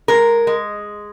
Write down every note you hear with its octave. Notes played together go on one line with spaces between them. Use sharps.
G#3 A#4
G#3